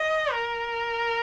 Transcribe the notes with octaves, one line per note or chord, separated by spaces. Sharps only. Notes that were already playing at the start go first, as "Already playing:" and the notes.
Already playing: D#5
A#4